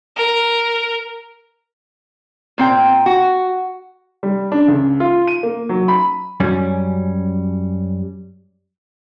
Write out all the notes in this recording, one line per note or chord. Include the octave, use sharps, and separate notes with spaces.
A#4
A#2 C4 G5
F#4
G3
D4
C#2
F4
D#7
A#3
F#3
B5
F#2 G3 C#4